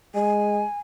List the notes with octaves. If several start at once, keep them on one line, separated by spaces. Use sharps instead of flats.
G#3 G#5